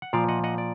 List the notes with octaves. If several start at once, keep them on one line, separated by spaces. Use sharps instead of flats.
F#5
A#2 F3 D5 F5
D#5 F#5
D#5 F#5
D5